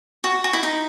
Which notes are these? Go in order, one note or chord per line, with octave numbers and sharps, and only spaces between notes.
F#4
F#4
E4
D#4